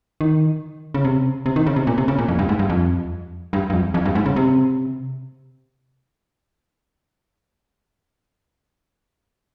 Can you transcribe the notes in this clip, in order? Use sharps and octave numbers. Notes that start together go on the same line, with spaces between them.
D#3
C#3
C3
C3
D#3
C#3
C3
A#2
C3
C#3
A#2
F2
G2
G#2
G2
F2
G2
G2
F2
F2
G2
G#2
C#3
C3